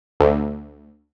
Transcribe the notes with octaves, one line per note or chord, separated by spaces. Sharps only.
D2